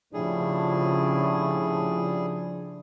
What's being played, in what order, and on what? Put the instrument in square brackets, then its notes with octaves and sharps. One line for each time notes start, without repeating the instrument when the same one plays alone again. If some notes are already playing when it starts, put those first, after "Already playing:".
[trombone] A2 [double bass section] C#3 [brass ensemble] F3 D4 [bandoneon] G3 G#4